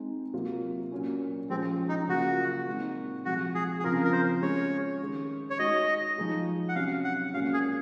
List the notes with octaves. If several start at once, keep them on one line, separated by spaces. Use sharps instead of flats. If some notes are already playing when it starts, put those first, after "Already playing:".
Already playing: G#3 C4 D#4
C3 F#3 A#3 F4
A#2 F#3 C#4
F3 G#3 C4 C#4 G#4
D#4
C#3 F#3 A#3 F4 F#4 G#4
A#2 G#3 C4 D#4
C3 F3 G#3 F#4
G#4
G#4
C#3 F3 C4 F4 A#4
A#4
C5
G#3 C#4 F4 G#4 C#5
D#3 G#3 C#4 G#4
C#5
G#3 D#4 F#4 D#5
F3 G#3 D#4 G#4
F#5
C3 F#3 C#4 F5
F#5
A#2 G#3 C#4 F#4 F5
G#4